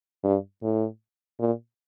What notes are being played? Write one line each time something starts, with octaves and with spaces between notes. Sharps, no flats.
G2
A2
A#2